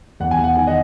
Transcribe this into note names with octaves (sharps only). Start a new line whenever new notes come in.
E2 F#5
G#5
E2
F#5
D#3 G#5
D#5 F#5